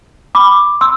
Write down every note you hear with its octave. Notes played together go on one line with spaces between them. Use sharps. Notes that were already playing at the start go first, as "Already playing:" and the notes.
B5 D6
C6 E6